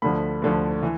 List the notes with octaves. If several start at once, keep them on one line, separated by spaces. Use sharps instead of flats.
D2 D3 F3 B5
D2 D3 F3
E3